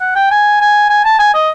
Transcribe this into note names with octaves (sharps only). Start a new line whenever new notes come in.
F#5
G5
G#5
G#5
G#5
A5
G#5
D#5